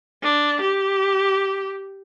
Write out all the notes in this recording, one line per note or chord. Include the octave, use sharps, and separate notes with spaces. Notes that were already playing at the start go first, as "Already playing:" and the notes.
D4
G4